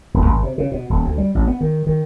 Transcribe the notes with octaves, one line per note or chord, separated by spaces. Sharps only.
D#1
G#1
C3
C#3
B2
D#1
D2
G3
A1
B3
D#3
D#3